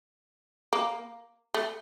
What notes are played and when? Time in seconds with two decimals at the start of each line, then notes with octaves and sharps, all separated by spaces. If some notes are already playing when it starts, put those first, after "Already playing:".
0.73 A#3
1.54 A3